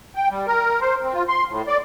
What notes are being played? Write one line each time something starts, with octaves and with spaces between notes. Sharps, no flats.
G5
G3
A#4
C5
C4
F4
C6
A2
D5